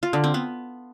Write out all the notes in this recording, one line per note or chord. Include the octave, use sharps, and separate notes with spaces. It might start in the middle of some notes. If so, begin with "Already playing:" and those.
F4
D3
C4
B3